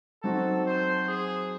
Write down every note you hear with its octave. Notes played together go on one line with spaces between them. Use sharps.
F#3 C4 D#4 F#4 A4
C5
G#4